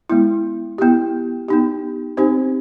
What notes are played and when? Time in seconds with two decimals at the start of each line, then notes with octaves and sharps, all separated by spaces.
0.09 G#3 B3 E4
0.78 B3 E4 G4
1.48 B3 D#4 G4
2.17 C4 D#4 G4 C5